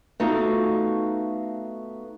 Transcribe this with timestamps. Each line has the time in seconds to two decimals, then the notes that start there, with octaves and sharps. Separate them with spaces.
0.20 A3 B3 D#4 F4 F#4 A4